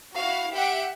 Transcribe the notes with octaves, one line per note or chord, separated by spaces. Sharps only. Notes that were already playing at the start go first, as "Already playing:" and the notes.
E4 F#4 F5
G4 E5 F#5 G5 D7